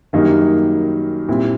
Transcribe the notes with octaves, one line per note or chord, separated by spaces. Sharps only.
F#2 D#3 G3 A#3 D#4
A#2 G3 C4 E4